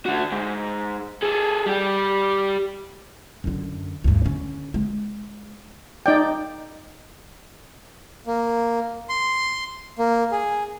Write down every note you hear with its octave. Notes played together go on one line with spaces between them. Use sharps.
D3 F#4
G#2
G#4 A4
G3 G4
F#2 D3
D2 G2
D3 C#4
G#3
D#4 D5 G5
A#3
C6
A#3
G#4